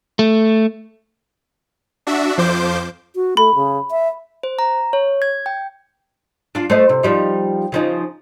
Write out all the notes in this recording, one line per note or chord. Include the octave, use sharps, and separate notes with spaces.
A3
D4 F#4 E5
F2 F3 C5 D6 G6
F#4
A3 B5
C#3
E5
C5
A#5
C#5
G#6
G5
D4 F4
A3 C5 D#5
C3
F3 G3 D#4
C#3 F3 D#4